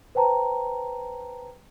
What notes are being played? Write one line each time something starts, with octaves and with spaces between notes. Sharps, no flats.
B4 C5 G5 A5 A#5